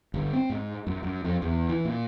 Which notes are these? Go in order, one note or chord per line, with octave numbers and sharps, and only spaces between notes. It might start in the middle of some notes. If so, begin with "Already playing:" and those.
G1
C4
G#2
F#2
F#2
F2
E2
E3
A#2